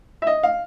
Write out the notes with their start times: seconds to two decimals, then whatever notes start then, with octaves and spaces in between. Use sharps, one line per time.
0.22 E5
0.27 D#5
0.43 F5